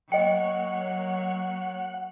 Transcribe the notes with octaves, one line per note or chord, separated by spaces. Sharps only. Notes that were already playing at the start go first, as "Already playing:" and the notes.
F#3 A#3 C#5 D#5 F#5 G5